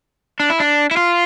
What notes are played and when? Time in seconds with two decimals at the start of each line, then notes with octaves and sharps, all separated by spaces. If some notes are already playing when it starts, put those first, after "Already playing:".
0.40 D4
0.50 E4
0.60 D4
0.91 E4
0.97 F4